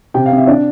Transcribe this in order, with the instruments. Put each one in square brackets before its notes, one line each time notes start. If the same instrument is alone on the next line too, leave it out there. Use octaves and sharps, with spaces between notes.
[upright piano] C3 G5
F5
C4
E5
D4 D5